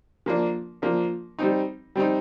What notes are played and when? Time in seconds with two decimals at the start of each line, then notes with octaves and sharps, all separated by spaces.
0.26 F3 A#3 D4
0.82 F3 A#3 D4
1.39 G3 C4 D#4
1.96 G3 C4 D#4